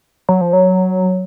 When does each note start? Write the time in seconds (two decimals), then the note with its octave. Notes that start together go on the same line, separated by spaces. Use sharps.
0.29 F#3
0.41 F3
0.53 F#3